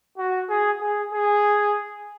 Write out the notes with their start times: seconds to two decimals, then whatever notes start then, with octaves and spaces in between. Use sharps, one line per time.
0.18 F#4
0.49 G#4
0.81 G#4
1.12 G#4